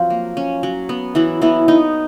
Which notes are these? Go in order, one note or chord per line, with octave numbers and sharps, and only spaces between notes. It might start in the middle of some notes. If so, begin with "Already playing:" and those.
Already playing: F3 F#3 C4 F4
A#3
C#4
F#3
B3
E3 F#3 E4
E3 B3 E4
B3 D#4